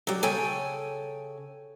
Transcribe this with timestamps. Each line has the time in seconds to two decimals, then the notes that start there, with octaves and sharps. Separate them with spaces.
0.07 F#3 G3
0.23 C#3 A4 C#5 G5 G#5